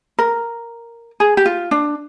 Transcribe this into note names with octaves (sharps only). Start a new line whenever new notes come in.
A#4
G#4
G4
F4
D4